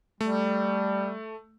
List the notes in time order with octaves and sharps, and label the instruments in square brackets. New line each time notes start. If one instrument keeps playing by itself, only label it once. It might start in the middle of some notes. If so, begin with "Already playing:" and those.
[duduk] G3 [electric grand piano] A3